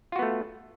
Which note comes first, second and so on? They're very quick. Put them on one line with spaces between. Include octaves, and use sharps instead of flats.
F4 F#4 B3 A3